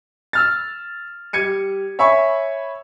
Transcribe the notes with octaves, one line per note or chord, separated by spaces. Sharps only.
E6 F6 A6
G3 G#6 C#7 D#7
C#5 E5 G#5 B5 C#6